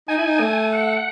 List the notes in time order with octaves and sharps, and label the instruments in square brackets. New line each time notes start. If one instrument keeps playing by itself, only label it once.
[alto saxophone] D#4 [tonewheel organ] G#5
[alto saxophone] E4
D#4
A3
[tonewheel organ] F#5